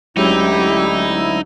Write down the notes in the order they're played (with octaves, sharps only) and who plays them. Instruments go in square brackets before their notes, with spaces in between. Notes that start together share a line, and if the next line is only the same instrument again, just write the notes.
[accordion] D2 E4 E6 [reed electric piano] F#3 G#3 C#4 [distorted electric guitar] D#4 [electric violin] G4